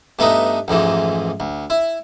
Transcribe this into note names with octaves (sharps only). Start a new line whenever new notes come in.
G2 A3 B3 D#4 A#5 D#6
A1 F2 G#2 E3
D2
E4